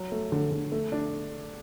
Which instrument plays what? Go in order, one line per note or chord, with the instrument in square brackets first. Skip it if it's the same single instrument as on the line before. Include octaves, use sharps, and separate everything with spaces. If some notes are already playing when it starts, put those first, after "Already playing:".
Already playing: [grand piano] F#3
A3
D3
D3
A3
D4